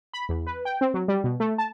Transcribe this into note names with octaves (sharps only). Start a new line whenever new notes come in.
B5
E2
B4
G5
C4
F#3
G3
B2
A3
A5